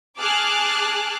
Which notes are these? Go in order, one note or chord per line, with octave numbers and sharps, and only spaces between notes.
G#4 A5 D6 F6 F#6